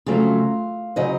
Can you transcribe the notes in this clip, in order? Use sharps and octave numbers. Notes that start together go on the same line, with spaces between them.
F2 C#3 F#3 A3 F4
C#3 F#3 C5 D#5